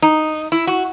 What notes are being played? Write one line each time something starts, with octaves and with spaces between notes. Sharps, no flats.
D#4
E4
F#4